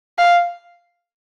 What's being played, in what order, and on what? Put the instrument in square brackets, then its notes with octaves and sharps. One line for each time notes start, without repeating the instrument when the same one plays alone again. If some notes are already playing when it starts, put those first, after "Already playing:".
[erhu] F5